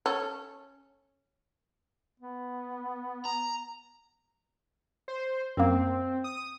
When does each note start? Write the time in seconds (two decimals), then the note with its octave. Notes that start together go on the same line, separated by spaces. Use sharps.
0.06 C#4 A4
2.20 B3
3.25 A#5
5.08 C5
5.57 F#2 A#3 C4
6.24 D#6